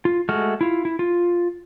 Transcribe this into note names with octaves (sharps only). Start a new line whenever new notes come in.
F4
G#3 A3 F#4 F6
E4 F4
E4
F4